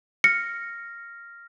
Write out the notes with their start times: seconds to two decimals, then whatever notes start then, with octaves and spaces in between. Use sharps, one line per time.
0.24 F6 A#6 C#7